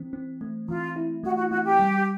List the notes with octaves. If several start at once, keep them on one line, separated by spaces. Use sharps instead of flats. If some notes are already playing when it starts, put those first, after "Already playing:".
Already playing: E3 C4
C4
A3
E3 F4
E4
A3 F#4
F#4
A3 F#4
G4
G3